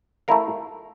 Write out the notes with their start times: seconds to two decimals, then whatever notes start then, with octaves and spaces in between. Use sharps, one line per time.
0.28 A3 E4 A#4 F5